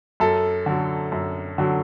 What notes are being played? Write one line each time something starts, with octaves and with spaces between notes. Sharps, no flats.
F#2 A4
D3 F#3
F#2
D3 F#3